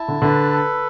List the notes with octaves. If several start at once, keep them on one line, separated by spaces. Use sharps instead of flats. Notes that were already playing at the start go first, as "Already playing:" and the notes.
Already playing: E4 A5
D3
D3 B4
A4